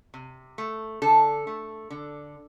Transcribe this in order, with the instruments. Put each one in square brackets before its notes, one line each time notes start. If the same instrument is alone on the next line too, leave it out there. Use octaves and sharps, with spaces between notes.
[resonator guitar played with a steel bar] C3
A3
D3 A4
A3
D3